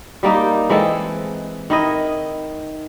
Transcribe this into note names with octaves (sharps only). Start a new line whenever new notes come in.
G3 A#3 D#4 G4
E3 G#3 C4 A4
D#3 E4 D#5